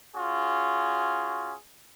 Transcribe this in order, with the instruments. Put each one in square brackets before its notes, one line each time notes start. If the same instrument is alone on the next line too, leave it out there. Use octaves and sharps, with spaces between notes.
[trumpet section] C#4 F4 F#4 G#4